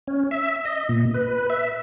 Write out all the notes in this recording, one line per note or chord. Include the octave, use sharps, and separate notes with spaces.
C#4
E5
D#5
A#2
B4
E5